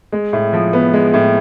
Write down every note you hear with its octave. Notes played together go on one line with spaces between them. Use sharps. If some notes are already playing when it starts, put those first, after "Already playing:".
G#3
A2
F3
B3
G#3
A2